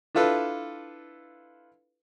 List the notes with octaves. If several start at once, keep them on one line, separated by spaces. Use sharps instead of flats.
D4 E4 F4 A4 B4